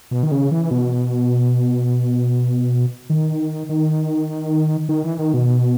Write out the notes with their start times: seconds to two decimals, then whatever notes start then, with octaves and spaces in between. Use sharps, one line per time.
0.11 B2
0.23 D#3
0.31 C#3
0.51 E3
0.71 B2
3.10 D#3
3.69 D#3
4.89 D#3
5.04 E3
5.19 D#3
5.34 B2